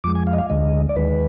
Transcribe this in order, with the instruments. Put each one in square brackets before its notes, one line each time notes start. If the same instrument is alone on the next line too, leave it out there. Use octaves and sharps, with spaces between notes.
[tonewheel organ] F2 F3 G#3 D6
G#5
F5
D#5
F5
D2 D3 G#3 D#5
D5
D#2 D#3 G#3 B4